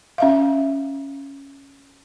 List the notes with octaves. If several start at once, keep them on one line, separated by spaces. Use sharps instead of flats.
C#4 E5 F5